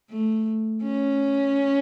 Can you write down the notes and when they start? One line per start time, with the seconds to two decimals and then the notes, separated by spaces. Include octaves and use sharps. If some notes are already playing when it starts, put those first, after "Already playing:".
0.10 A3
0.83 C#4